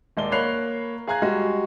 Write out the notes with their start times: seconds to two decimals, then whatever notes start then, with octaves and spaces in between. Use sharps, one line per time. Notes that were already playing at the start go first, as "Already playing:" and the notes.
0.17 D#1 G#3 D5 G7
0.32 A#3 C#5 B5 F#6 C7 F7
1.07 G#4 F5 G#5 A#5 F#6 G#6
1.22 G3 G#3 F#4